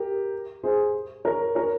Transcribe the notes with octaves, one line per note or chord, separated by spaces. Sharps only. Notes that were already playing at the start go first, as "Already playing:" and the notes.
Already playing: G4 A#4
G#4 C5
A#4 C#5
A#4 C#5